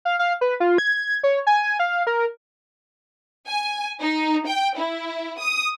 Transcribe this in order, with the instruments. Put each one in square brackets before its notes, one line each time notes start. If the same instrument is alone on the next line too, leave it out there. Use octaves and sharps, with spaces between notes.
[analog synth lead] F5
F5
B4
F4
G#6
C#5
G#5
F5
A#4
[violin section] G#5
D#4
G5
E4
D#6